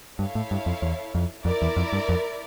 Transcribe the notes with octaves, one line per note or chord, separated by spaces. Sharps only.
G2 E4 A4 C#5 F5
A2
G2
F2
E2
F2
F2 E4 A#4 D5
E2
F2
G2
F2